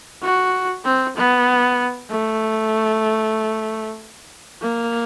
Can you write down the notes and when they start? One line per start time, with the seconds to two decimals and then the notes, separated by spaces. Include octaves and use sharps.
0.23 F#4
0.85 C4
1.16 B3
2.11 A3
4.62 A#3